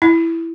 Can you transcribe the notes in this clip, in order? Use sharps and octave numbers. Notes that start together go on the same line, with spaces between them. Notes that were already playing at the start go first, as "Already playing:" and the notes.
E4